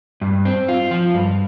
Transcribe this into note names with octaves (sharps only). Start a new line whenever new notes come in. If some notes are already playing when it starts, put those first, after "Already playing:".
G2
C4
F4
F3
G2